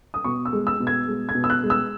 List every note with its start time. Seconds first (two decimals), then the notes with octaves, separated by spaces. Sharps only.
0.14 D#6
0.24 B2 C#6
0.45 E6
0.53 G#3
0.67 E6
0.80 B2
0.87 G#6
1.08 G#3
1.29 G#6
1.35 B2
1.44 E6
1.50 F#6
1.64 G#3
1.70 E6